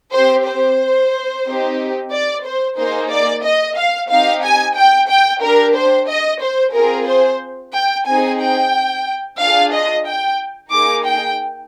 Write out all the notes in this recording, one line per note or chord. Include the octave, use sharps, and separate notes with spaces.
C4 G4 C5
C5
C4 D#4 G4
D5
C5
A#3 D#4 G#4 C5
D5
D#5
F5
C4 D#4 G4 F5
G#5
G5
G5
D4 G4 A#4
C5
D#5
C5
C4 F4 G#4 A#4
C5
G5
C4 D#4 G#4 G#5
G5
D4 F4 G#4 F5
D#5
G5
A#3 D#4 G#4 D6
G5